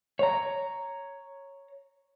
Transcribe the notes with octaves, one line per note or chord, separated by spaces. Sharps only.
C#5 A#5